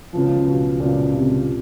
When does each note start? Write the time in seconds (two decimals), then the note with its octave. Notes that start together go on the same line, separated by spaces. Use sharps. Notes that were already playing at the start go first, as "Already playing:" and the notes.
0.13 C#2 C#3 F3 F#3 B3
0.47 B2
0.80 C#2 A#2 C#3 F#3 B3
1.14 C3